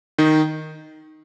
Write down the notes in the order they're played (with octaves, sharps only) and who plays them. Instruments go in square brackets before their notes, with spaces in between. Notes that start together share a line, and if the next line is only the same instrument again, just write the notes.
[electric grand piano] D#3 D#4